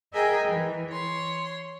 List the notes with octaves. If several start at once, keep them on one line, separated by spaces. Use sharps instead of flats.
G#4 A#4 D#5 E5 G5 G#5
E3
C#5 C6